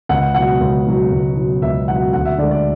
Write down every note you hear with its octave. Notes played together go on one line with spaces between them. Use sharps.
C#2 F#5
B2 F#3 F#5
C#2
B2 F#3
C#2
B2 F#3
C#2 E5
B2 F#3 F#5
D2 F#5
E5
D3 G#3 D5
D5